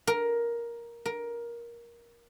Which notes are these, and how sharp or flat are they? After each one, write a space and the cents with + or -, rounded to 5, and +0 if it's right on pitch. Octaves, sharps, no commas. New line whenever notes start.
A#4 +10
A#4 +15